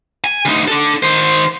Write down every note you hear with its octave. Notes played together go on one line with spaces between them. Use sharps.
G#5
D2 D#4
D4 A4
D#3 C5